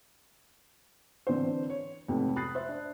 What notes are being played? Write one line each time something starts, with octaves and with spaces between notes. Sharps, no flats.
D3 E3 C4 D4 C5
C#5
F2 G#2 C3 A3 B3
B5 D#6 F#6 A6 C7
C5 E5
D4